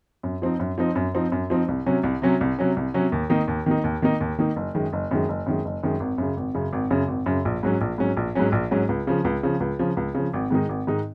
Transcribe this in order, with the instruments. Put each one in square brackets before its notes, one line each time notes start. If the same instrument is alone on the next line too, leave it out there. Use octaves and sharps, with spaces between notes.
[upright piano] F#2
F3 C4 D#4
F#2
F3 C4 D#4
F#2
F3 C4 D#4
F#2
F3 C4 D#4
C2
C3 F#3 C#4
C2
C3 F#3 C#4
C2
C3 F#3 C#4
C2
C3 F#3 C#4
D#2
D#3 A#3 D#4
D#2
D#3 A#3 D#4
D#2
D#3 A#3 D#4
D#2
D#3 A#3 D#4
F#1
F#2 D#3 G#3
F#1
F#2 D#3 G#3
F#1
F#2 D#3 G#3
F#1
F#2 D#3 G#3
G#1
F#2 C#3
G#1
F#2 C#3
G#1
F#2 C#3
G#1
F#2 C#3
A#1
G#2 F#3 C#4
A#1
G#2 F#3 C#4
A#1
G#2 F#3 C#4
A#1
G#2 F#3 C#4
C#2
C#3 F3
C#2
C#3 F3
C#2
C#3 F3
C#2
C#3 F3
G#1
G#2 D#3 G#3 D#4
G#1
G#2 D#3 G#3 D#4